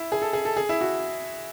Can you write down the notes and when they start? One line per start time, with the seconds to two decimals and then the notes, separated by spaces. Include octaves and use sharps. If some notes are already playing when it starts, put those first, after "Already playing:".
Already playing: E4
0.12 G#4
0.22 A4
0.33 G#4
0.45 A4
0.57 G#4
0.69 E4
0.81 F#4